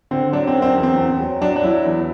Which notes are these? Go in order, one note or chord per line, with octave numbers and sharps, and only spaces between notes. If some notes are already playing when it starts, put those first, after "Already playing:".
D3 C4
F#3 D4
C4
F#2
C4
E2
C4
E2
F#3
F#3 D4
D4
F#3 E4
E2